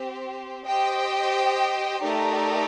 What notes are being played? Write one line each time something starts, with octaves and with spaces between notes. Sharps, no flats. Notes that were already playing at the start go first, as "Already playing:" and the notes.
Already playing: C4 G4 C5
G4 C5 D#5 G5
A3 D#4 G4 A#4 D5